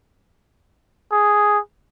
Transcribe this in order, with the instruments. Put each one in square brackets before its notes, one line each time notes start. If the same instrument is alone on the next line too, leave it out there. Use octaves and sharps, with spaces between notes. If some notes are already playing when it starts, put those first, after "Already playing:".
[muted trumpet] G#4